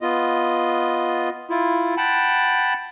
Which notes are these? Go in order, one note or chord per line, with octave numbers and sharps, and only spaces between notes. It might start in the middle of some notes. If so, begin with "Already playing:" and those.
B3 F4 D#5
E4 F4
F#5 G5 A5 B5